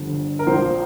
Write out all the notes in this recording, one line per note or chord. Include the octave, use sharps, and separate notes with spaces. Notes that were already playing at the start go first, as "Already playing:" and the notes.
Already playing: G1 G2 D3 F3
A#4
A#1 A#2 F3 C5